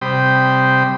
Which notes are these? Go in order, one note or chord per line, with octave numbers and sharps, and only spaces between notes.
C3 G3 C5 G5 B5 D#6